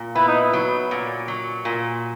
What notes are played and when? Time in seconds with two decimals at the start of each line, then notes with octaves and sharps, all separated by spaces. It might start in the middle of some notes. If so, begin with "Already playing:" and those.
Already playing: A#2
0.15 B3 E4
0.28 D#4
0.41 E4
0.53 F#3
0.91 A#2
1.28 F#3
1.65 A#2